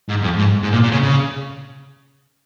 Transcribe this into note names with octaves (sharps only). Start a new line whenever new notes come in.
G#2
F2
G#2
G#2
A#2
A#2
C#3
C#3